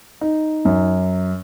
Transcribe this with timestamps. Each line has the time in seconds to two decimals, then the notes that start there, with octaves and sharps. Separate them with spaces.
0.21 D#4
0.65 F#2